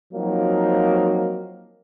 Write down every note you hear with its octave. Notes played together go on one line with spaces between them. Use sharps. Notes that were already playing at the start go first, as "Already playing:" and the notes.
F3 F#3 A#3 C4 D#4